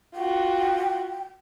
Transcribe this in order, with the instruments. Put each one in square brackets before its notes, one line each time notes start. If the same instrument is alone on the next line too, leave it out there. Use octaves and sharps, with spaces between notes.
[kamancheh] F4 F#4 [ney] G5